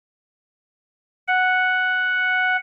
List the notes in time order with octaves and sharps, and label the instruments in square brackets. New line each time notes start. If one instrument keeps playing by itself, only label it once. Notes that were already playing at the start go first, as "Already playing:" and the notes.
[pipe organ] F#5